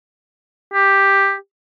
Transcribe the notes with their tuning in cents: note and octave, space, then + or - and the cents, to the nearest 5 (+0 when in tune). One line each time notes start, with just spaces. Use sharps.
G4 +5